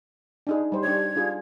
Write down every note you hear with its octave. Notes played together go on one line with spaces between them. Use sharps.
D4 D#4 G#4
G3 C5
D4 G4 C#5 G#6
D4 F4 G#4